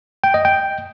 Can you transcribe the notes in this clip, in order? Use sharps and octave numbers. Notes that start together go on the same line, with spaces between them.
G5
D#5
G5